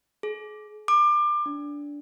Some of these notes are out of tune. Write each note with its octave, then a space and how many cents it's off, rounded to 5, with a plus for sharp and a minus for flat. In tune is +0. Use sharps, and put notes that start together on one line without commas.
G#4 +35
D6 +25
D4 -15